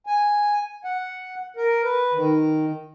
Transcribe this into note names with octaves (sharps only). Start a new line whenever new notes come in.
G#5
F#5
A#4
B4
D#3